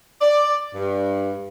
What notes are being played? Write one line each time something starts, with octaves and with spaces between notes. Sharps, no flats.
D5
G2